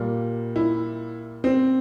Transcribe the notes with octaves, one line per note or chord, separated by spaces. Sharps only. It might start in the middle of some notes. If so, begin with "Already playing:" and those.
Already playing: A#2 G3 A#3
E4
C4